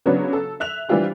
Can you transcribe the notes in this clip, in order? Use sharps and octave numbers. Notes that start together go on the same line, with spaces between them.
C#3 F#3 B3 D4 F#4 C#5
A4
E5 F#6 F7
E3 G3 D4 F4 G4 C5